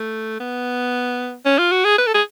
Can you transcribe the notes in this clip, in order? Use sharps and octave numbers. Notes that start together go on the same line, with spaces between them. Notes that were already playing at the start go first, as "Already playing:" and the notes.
Already playing: A3
B3
C#4
F4
F#4
G#4
B4
A4
G#4